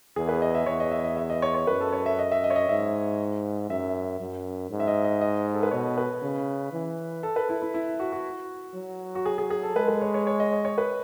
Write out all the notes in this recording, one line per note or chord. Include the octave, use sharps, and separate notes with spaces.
E2 G#4
B4
D#5
E5
E2 C#5
D#5
E5
D#5
E5
D#5
C#5
C#5
F#2 B4
A4
C#5
E5
D#5
E5
D#5
C#5
D#5
G#2 E5
F#2 E5
F#2
G#2
E5
D#5
D#5
D#5
A4
B4
B2 C#5
B4
C#3
E3
A4
B4
E4
E4
E4
F#4
F#4
F#3
F#4
G#4
G#4
G#4
A4
G#3 B4
B4
C#5
C#5
C#5
D#5
C#5
C#5
B4